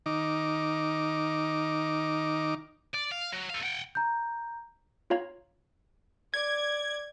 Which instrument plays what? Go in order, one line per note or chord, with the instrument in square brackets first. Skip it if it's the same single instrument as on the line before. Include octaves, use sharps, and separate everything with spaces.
[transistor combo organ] D#3 D#4 D6
[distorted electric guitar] D5
F5
F#3
A4 F5
F#5 G5
[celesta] A#5 G6
[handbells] F4 C#5 F5 A#5 G#6
[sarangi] D5 [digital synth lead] G#6